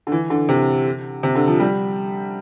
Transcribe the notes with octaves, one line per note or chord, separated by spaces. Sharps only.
D3
E3
D3
C3
C3
D3
F3
G3